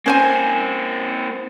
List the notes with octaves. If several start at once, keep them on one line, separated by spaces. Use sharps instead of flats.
A#3 C4 C#4 C5 G#5